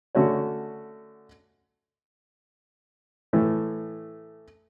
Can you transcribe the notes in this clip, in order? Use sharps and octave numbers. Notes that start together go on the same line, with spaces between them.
D3 A3 C#4 F#4 C#5
A2 E3 A3